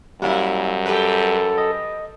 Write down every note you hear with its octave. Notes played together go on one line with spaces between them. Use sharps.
F#2 G3 A#3 E4
G4 A4 B4
D#5